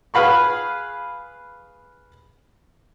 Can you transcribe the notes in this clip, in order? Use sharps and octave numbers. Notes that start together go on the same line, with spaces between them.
G#4 B4 F5 B5 C#6